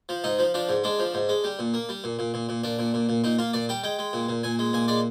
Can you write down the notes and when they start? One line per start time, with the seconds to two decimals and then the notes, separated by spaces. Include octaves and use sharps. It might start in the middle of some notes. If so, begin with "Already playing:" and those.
0.09 F3
0.24 G#2 D#4
0.39 F3
0.54 F3 D4
0.69 G#2
0.84 G#3 D4
0.99 F3
1.14 G#2
1.29 G#3
1.44 G3
1.59 A#2
1.74 A#3
1.89 G3
2.04 A#2
2.19 A#2
2.34 A#2
2.49 A#2
2.64 A#2 D4
2.79 A#2
2.94 A#2
3.09 A#2
3.24 A#2 D#4
3.39 A#3 F4
3.53 A#2 D5
3.69 G3 G5
3.84 G#3 G5
3.99 G#3
4.13 A#2
4.29 A#2
4.43 A#2 G#5
4.59 G#3
4.73 A#2 G#5
4.88 G#3 D5